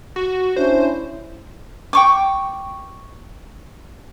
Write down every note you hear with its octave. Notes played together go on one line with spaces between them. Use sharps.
F#4
C#4 D4 E4 C5
G5 C#6 D6